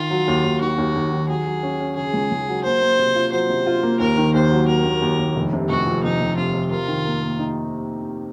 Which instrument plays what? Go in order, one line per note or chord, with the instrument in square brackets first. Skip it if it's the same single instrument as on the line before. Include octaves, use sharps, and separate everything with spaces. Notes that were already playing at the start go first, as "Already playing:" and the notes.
Already playing: [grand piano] D#3 [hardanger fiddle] F4
[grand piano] F#3
D#2
D#2
[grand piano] D#3 [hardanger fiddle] F#4
[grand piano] D#2
D#2
D#3
[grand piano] F#3 [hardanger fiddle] G#4
[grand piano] F#3
C#4
C#4
[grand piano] C#3 [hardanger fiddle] G#4
[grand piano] C#2
C#2
F#3
[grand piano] A#3 [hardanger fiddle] C5
[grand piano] A#3
C3
F4
[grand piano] F#3 [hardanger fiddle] C5
[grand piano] C3
F4
A#3
[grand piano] D#2 [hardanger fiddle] A#4
[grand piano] D#3
[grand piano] D#2 [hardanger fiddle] C5
[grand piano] F#3
[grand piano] F#3 [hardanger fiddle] A#4
[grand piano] D#2
D#2
D#2
F1
C3
[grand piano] F1 [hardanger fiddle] F#4
[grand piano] F2
[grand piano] F1 [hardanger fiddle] D#4
[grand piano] F1
[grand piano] C3 [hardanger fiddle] F4
[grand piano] C3
[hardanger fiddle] F4 [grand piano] A#4
[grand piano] D#3
A#3
A#3
D#4